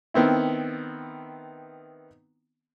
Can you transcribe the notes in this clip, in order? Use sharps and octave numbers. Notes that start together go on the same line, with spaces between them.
D#3 B3 C4 E4